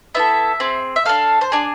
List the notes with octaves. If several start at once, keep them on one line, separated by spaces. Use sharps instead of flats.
B3 E4 A4 E5
C4 G#4
E5
D4 A4 F5
C5
D4 G#4 D5